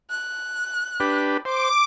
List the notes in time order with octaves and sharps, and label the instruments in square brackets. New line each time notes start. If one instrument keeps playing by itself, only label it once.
[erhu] F#6
[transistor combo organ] D4 G4 B4
[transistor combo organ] C5 [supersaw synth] D6